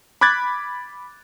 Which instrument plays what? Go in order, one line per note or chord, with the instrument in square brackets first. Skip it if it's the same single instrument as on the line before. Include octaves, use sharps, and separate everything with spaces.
[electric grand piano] B5 D6 F#6 G#6 A6